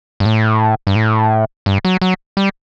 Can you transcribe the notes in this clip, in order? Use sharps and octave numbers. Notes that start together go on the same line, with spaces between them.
G2
A2
G2
A2
G2
F#3
F#3
G3